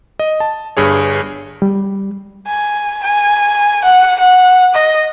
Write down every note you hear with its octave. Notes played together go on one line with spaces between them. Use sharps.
D#5
A5
G1 G2 G#4 C#5
G3
G#5
G#5
F#5
F#5
D#5